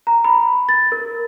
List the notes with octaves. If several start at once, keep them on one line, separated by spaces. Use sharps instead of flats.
A#5
B5
A6
A#4